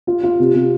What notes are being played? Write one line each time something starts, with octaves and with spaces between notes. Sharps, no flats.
F4
F4
C3
C3